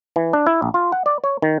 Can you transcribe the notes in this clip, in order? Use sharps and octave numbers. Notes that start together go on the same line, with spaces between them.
E3
D4
E4
A#1
F4
F#5
D5
C#5
D#3